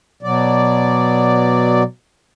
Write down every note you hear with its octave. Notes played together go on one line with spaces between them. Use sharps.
B2 F#3 D5